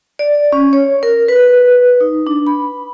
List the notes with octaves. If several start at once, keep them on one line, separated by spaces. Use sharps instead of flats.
D5
C#4
C#5
A#4
B4
D#4
D4
B5